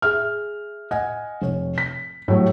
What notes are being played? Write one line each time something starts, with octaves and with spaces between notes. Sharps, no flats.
G#4 E5 F6
D#5 F#5 G#5
F1 C#5
B6
A2 F#3 G3